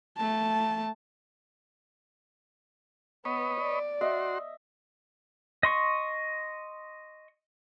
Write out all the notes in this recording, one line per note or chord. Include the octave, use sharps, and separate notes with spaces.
A3 A5
B3 B4 C#5 D#5
D5
F#4 D#5 E5 C6
D#5 C6 C#6